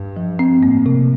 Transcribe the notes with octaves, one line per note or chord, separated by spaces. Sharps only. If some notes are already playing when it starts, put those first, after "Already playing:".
Already playing: G2
F3
C4
A2 A#3
C3